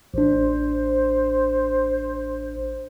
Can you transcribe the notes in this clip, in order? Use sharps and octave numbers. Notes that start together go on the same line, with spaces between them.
A1 D4 C5